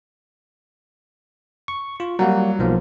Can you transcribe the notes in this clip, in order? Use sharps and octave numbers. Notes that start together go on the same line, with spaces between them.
C#6
F4
F#3 G3 A#3 F5
B1 F3 A#3